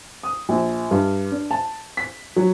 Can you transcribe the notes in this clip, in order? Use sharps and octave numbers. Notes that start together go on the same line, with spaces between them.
D#6
A#1
G2
D4
A5
B6
F#3